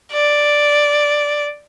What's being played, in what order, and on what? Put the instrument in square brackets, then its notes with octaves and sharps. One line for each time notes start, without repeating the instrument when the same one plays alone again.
[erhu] D5